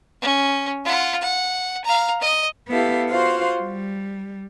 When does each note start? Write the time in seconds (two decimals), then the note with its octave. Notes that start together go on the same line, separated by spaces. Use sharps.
0.21 C#4
0.85 F4 F#5
1.21 F#5
1.85 F5 A#5
2.21 D#5
2.69 B3 E4 G4 A4 F5
3.10 F4 F#4 C5 F5
3.62 G3